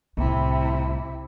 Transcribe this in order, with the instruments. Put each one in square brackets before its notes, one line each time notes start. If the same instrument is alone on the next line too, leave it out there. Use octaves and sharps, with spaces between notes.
[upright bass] C2 A2 [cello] C3 E4